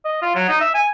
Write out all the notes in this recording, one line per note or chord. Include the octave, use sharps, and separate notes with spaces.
D#5
F4
F#3
D#4
E5
G#5